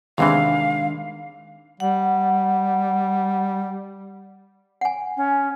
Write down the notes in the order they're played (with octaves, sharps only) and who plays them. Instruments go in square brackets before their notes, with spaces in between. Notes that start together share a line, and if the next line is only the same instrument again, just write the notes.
[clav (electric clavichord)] E2 C3 E3 [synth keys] D#3 G#3 D4 [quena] F5
[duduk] G3 [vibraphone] F#5
[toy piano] F#5 G#5
[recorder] C#4